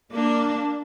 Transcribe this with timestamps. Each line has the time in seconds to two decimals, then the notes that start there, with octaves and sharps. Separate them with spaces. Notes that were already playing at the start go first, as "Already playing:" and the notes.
0.12 A#3 D4